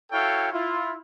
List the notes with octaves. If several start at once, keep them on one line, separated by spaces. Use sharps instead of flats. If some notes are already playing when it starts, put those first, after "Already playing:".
E4 F#4 A4 C#5 F5 G5
E4 F4